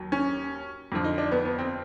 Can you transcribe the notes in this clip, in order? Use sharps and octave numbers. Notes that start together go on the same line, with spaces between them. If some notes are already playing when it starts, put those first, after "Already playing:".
Already playing: D#2 F#3
C#4
F2 D3 F3
D#4
D4
B3
B3
C4